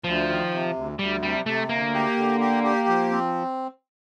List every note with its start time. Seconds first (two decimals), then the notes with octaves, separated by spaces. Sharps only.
0.04 D2 F3
0.29 D#3
0.52 C3
0.76 D2
0.99 D2 G3
1.23 C3 G3
1.46 C3 A3
1.69 D2 A#3
1.93 G4
2.17 D3
2.40 G4
2.63 G4
2.87 F3
3.11 C4